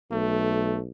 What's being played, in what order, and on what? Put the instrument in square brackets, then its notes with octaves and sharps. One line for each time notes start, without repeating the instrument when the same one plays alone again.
[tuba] B1 [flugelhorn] A3